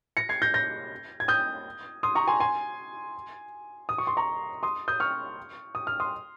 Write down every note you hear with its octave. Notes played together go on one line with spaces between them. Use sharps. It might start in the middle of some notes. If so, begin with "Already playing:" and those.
A#6 C#7
G#6 C7
G6 A#6
G6 A#6
G#6
D#6 G6
C6 D#6
A#5 C#6
G#5 C6
G#5 C6
D#6
C#6
C6
A#5 C#6
C6 D#6
D#6 G6
C#6 F6
D#6
F6
C6 D#6